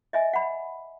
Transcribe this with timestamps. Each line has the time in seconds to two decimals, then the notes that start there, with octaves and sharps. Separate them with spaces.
0.13 D#5 E5 G#5
0.33 F#5 B5